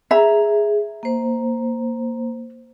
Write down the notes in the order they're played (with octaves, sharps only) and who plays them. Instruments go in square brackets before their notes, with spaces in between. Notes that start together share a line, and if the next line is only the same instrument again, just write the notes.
[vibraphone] G#4 [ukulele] E5 A#5
[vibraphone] A#3 C5